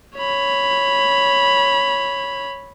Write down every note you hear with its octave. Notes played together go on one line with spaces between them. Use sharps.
C#5 B5